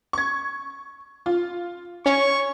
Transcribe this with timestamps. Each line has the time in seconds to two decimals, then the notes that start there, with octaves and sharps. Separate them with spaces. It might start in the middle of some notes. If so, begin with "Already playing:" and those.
0.13 C#6 G#6
1.26 F4
2.06 C#4 C#5 C#6